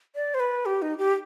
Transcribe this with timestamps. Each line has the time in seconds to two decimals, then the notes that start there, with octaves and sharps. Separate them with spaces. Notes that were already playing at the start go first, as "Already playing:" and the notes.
0.15 D5
0.34 C5
0.40 B4
0.66 G4
0.82 D#4
0.98 G4